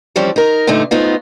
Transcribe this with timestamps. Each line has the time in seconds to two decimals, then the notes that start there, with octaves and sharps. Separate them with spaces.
0.16 E3 F3 G3 C4 C#4
0.36 D#4 A#4
0.67 G2 A#2 D3 A3 D#4
0.91 G#2 A3 B3 D#4 F4